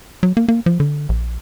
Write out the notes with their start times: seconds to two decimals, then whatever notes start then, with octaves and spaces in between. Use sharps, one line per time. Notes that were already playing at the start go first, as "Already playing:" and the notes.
0.23 F#3
0.37 A#3
0.48 A#3
0.66 F3
0.80 D3
1.09 A#1